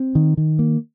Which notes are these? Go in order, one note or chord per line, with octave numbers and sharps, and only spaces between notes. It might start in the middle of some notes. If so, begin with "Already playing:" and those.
Already playing: C4
D#3
D#3
A#3